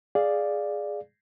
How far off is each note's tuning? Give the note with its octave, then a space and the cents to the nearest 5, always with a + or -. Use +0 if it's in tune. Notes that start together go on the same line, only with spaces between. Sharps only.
G#4 +0 D5 +0 F5 +0